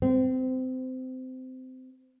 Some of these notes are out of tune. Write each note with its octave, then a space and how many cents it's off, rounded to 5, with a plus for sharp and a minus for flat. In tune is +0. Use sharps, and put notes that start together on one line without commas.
C4 -25